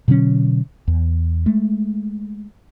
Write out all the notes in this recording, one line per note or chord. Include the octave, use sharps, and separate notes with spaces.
B2 D3 F#3 C#4
E2
G#3 A3